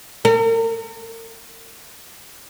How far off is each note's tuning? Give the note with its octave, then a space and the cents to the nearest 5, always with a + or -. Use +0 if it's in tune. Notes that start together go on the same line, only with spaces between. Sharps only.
A#4 -40